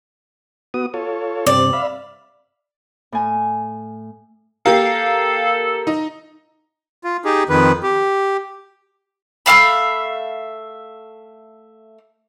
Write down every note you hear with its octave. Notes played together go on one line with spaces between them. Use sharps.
B3 F#4 D#6
F4 A4 C#5
G2 C3 C4 D5
E5 F5 B5
A2 G#5
A#3 G4 A4 A#4 F5
D#4 D#5
F4
D#4 G4 G#4
F2 D#3 B4
G4
A3 E5 F5 B5